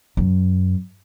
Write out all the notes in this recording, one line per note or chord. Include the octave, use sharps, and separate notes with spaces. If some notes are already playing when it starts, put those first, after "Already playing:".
F#2